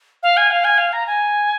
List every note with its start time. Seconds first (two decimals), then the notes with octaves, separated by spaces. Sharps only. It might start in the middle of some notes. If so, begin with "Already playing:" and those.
0.23 F5
0.37 G#5
0.51 F5
0.64 G#5
0.78 F5
0.93 A#5
1.07 G#5